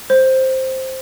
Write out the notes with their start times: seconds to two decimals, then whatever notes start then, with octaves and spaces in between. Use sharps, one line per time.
0.10 C5